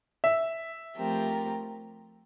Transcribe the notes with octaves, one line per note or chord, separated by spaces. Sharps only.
E5
F3 A3 C4 G4 A#4